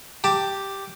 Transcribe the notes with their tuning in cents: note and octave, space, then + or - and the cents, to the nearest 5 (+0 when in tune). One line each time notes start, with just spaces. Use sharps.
G4 +0 A5 +15